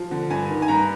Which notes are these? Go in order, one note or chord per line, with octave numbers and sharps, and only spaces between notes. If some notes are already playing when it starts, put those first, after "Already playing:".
Already playing: F3
D3
G2 G#5
D#3
G#5
G2 A#5